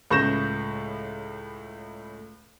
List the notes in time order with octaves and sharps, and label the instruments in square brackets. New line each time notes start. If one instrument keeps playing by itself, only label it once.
[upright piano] C#2 A2 C#6 G6 A#6 E7